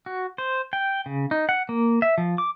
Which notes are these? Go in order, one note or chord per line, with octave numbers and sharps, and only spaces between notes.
F#4
C5
G5
C#3
D#4
F#5
A#3
E5
F3
D6